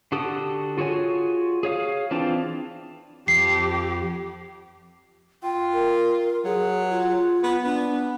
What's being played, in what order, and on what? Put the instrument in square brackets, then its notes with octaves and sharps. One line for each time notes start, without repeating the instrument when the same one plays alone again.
[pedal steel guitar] D3 F#4 G4 A4 D#6
F4 F#4 G#4 C#5 G#5
G#4 C#5 F5 D#6
E3 C4 D4 F4 A5
[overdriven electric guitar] F2 [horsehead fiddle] G4 [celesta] C7
[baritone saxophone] F4 [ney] G5
[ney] A#4
[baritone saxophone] F#3 [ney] G#4
[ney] F4
[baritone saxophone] B3
[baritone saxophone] B3 [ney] D4